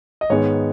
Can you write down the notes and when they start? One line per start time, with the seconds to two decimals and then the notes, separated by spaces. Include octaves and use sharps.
0.21 D#5
0.30 G#2 D#3 G#3 B3 C#5